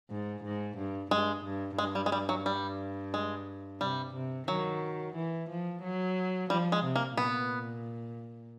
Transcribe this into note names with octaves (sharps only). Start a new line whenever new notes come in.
G#2
G#2
G2
G2 G#3
G2
G2 G#3
G3
G#3
G3
F#3
G3
G#3
C3 G3
C3
D#3 F#3
E3
F3
F#3
F3 G3
G#3
C3
A#3
A#2 B3